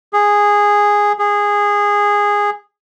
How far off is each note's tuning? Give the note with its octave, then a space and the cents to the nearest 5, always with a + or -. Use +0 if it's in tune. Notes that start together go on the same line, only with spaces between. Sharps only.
G#4 -10
G#4 -15